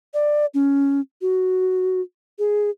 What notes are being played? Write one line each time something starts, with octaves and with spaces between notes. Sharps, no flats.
D5
C#4
F#4
G#4